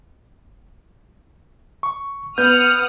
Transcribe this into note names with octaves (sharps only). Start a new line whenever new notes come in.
C#6
B3 F#5 D#6 F6 G6